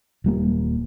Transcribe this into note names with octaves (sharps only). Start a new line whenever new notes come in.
D#1 G3 A#3